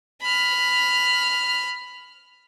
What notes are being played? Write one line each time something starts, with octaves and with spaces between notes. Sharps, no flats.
B5 F6